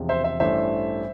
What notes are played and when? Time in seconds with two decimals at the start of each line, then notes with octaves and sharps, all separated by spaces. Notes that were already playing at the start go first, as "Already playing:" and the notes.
Already playing: E1 E2 C3 F3
0.09 C5 E5
0.24 C5 E5
0.40 A1 G2 E3 A3 D4 C5 E5